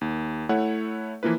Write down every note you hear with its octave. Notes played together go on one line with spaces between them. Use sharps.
D#2
A3 E4 C#5 F#5
E3 F3 A#3 E4 B4